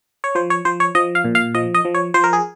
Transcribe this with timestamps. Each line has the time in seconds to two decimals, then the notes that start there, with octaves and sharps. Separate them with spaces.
0.24 C#5
0.35 F3 C5
0.50 C#5
0.65 F3 C5
0.80 C#5
0.95 F3 D#5
1.15 F5
1.25 A#2
1.35 F5
1.55 F3 D#5
1.74 D#5
1.85 F3
1.94 C#5
2.14 F3 C5
2.24 A#4
2.33 G#4